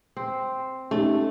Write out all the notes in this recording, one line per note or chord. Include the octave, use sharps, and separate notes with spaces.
C4
A3 C#4 D#4 G4